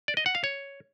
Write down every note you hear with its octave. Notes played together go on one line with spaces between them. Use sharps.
D5
D#5
F#5
F5
C#5